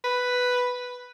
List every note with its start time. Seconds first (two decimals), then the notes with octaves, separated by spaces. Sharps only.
0.04 B4